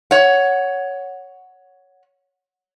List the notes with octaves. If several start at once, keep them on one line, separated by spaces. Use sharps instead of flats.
C#5 F#5